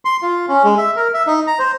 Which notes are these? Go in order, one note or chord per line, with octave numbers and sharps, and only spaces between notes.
C6
F4
C#4
G#3
E5
A#4
E5
D#4
A#5
C5